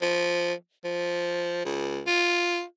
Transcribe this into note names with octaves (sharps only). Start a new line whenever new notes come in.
F3
F3
C#2
F4